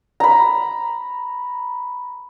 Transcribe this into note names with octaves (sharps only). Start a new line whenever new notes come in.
A#5 B5